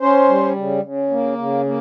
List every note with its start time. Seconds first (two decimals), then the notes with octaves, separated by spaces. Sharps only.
0.01 C#4 C5
0.28 G3
0.56 C#3
0.83 C#3
1.10 A#3
1.38 C#3
1.66 A#3